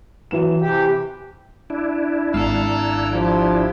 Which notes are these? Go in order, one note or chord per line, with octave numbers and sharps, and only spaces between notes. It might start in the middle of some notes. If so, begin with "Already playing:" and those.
E3 F#3 E7
C3 E3 G4 G5
D4 E4
G#1 A4 F5 A#5 E6
F3 G4